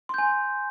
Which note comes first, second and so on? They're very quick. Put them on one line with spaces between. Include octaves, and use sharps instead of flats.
C6 G6 G#5